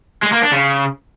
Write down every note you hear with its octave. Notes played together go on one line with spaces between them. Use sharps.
G#3
A#3
D4
C#3